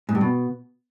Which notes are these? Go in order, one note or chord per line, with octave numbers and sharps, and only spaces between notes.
G#2
G2
B2